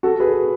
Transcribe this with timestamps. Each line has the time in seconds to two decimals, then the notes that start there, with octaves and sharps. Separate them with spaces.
0.03 F#4 A4
0.20 G#4 B4